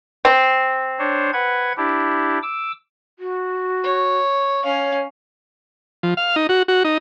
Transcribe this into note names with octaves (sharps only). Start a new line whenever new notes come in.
C4
D4 C5 C#5
B4 F#5 G#6
D4 E4 G4
D6 E6
F#4
C#5
C#4 C#5 F5
F3
F5
D#4
F#4
F#4
D#4